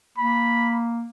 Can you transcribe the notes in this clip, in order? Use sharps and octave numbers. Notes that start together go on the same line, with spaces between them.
A#3 B5